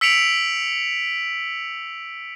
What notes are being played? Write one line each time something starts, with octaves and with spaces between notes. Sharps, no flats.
E6 B6 C#7 D7 F7 F#7